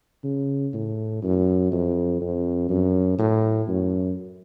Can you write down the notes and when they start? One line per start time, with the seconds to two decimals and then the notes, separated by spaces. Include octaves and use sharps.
0.24 C#3
0.74 A2
1.23 F#2
1.72 F2
2.21 F2
2.69 F#2
3.18 A2
3.68 F#2